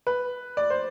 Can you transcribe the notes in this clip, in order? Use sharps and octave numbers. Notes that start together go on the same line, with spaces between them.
B4
D5
C5